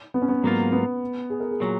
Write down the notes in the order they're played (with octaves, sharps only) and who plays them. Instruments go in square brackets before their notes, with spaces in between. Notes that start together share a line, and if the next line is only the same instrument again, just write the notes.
[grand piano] B3
C#4
B3
[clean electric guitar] G#2 F#3 A#3 F4
[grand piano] B3
G#4
A#4
G#4
[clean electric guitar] A#2 F#3